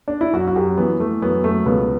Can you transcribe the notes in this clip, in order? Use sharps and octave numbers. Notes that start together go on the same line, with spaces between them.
D4
E4
F#2 F#4
F#4
F#2 G4
E3 B3
E3 A3
F#2 B3
F#2 A3
C#2 B3